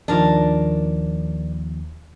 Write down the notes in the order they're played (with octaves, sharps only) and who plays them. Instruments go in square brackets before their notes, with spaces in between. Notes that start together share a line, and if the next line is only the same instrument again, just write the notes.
[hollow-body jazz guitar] D#2 D#3 F3 [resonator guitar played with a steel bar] D4 A#4